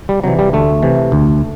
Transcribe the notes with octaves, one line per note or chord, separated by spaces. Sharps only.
G3
C3 E3 F#3
G3
D2 A3
C3 E3
D2